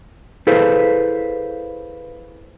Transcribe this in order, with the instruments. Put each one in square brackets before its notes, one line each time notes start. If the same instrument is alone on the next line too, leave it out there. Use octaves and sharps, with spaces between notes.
[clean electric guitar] E4 G#4 A4 B4 C5 F5